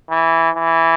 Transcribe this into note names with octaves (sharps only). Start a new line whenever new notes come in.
E3
E3